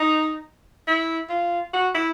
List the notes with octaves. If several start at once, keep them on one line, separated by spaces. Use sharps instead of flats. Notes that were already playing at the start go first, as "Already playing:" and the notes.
Already playing: D#4
E4
F4
F#4
E4